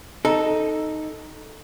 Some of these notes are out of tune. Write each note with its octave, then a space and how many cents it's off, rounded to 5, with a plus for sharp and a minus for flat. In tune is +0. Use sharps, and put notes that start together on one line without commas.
D#4 +0 A4 +0